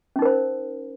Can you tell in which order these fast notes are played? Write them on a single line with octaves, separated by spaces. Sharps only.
C#4 D#4 A#4 C5